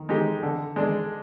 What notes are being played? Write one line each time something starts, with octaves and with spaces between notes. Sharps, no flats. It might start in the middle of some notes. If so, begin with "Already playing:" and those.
Already playing: D#3
G#3 D#4 G4
D3
G#3 D4